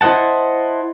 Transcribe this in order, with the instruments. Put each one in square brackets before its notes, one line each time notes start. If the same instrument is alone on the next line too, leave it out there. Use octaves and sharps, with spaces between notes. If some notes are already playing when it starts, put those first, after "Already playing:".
[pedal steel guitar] E4 C5 D#5 F#5 A5